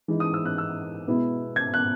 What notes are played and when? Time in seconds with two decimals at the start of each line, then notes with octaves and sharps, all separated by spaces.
0.08 E3 G#3 D#4
0.20 D#6
0.34 E6
0.45 F#6
0.58 E6
1.07 B2 G#3 B3 E4
1.56 G#6
1.74 F#6